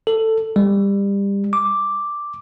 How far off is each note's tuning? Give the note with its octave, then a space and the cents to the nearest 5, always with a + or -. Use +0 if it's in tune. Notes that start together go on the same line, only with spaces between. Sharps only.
A4 +15
G3 +25
D6 +0